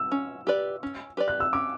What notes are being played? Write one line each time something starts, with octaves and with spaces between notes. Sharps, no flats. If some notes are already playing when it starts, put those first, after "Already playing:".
Already playing: E6
C#4
G4 B4 D5
C#4
G4 B4 D5
F#6
E6
C#4 D6